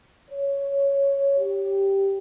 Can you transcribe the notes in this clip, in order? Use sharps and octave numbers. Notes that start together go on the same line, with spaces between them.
C#5
G4